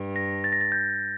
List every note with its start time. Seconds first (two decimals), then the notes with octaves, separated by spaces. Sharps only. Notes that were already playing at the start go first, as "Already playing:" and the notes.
Already playing: G2
0.16 A#6
0.44 A6
0.52 A#6
0.61 A6
0.72 G6